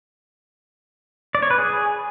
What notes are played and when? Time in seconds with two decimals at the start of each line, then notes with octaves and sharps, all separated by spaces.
1.35 D5
1.43 C#5
1.50 B4
1.58 G#4